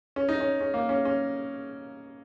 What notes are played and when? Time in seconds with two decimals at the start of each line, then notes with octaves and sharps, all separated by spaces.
0.16 C#4
0.29 D#4
0.40 C#4
0.61 C#4
0.74 A#3
0.89 C#4
1.05 C#4